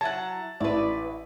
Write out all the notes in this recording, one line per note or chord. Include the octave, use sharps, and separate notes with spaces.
F#3 E4 F#5 A5
A1 E4 B4 D5